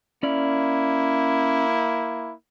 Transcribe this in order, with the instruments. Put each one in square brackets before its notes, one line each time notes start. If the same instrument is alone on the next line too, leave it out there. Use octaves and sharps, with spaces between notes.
[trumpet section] A#3 E4 [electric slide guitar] C#4 D5